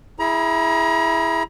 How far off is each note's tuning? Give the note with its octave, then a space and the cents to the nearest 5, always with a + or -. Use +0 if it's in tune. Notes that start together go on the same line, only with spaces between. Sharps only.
E4 +0 G#4 +0 A#5 +35